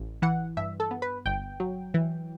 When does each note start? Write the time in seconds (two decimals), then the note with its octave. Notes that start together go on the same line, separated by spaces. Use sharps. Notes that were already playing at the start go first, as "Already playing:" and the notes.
Already playing: A1
0.22 E3 F#5
0.57 G2 E5
0.80 A4
0.91 B3
1.02 B4
1.26 G1 G5
1.60 F#3
1.94 E3